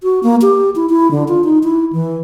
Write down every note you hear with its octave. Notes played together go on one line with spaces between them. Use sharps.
F#4
A#3
G4
E4
E4
D3
F4
D#4
E4
E3